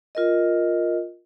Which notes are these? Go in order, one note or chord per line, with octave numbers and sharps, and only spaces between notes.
F4 A#4 D#5